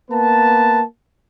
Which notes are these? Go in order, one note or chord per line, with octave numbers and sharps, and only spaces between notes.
A#3 B3 B4 A5